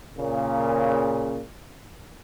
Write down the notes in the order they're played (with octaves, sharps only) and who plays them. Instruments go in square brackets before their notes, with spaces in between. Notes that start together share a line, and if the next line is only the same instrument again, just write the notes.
[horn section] A#2 C#3